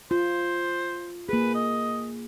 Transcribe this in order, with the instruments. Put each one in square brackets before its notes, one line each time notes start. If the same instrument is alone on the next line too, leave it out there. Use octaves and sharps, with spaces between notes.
[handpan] F4 [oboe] C5
[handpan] A#3 G#4 [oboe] B4
[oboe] D#5